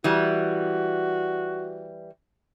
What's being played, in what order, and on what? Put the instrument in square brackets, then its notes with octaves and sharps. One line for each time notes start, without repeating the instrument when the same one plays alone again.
[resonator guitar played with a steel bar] E3 G3 [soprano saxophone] F#4